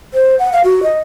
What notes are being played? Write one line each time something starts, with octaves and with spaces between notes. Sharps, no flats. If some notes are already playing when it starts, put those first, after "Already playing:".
C5
F#5
F5
F#4
D#5